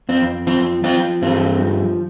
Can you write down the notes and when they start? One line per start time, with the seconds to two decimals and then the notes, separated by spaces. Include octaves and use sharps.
0.09 F2 C4
0.47 F3 C4
0.84 F3 C4 F4
1.22 G2 C4
1.60 F3